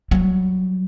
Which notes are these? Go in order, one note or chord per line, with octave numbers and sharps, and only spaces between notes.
F#3 G3